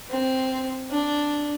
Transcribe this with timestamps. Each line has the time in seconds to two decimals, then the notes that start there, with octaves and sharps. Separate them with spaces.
0.10 C4
0.90 D4